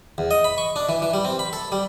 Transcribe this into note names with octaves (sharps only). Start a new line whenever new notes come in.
E2
D#5
B5
C#6
D4
E3
E3
G3
C4
B5
A4
G3